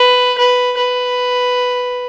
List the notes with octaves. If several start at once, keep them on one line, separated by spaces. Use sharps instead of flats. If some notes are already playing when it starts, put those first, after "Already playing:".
Already playing: B4
B4
B4